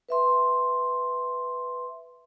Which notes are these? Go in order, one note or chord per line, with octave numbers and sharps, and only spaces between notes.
B4 E5 C6